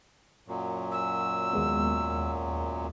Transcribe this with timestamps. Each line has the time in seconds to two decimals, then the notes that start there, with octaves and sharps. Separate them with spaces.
0.48 F#2 A#2 F#3
0.92 G#5 E6
1.53 D#2 G#3 B3